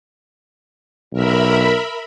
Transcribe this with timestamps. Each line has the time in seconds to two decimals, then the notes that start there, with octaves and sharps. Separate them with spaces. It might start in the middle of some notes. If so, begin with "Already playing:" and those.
1.13 B1 A#4 E5 B5